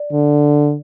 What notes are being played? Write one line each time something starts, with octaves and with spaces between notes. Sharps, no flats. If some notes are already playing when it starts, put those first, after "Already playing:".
Already playing: D5
D3